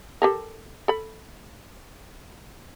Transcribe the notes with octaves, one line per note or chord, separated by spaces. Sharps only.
G4 A4 A#4
A4 B5